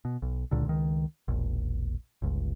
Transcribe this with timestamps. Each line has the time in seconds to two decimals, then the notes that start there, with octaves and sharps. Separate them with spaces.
0.05 B2
0.22 B1
0.51 C#2 A#2 D3
0.66 C#2 D#3
1.28 E1 A#1
2.22 G1 C#2